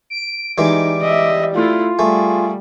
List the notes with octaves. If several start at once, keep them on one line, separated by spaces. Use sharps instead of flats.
D7
E3 G3 G#3 D#4 D6
D#5 E5
A3 E4 F4
G3 A3 G#4